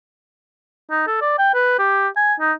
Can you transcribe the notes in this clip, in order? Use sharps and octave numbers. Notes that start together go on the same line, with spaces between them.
D#4
A4
D5
G5
B4
G4
G#5
D#4